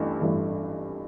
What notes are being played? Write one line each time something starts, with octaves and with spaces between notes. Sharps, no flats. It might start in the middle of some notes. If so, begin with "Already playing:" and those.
Already playing: A1 G2 E3 A3 D4
A1 G2 E3 A3 D4